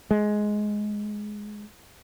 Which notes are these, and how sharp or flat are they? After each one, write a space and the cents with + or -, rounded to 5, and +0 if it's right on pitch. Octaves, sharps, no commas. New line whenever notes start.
G#3 +10